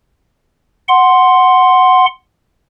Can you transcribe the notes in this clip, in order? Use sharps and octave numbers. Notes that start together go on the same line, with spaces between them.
F#5 C6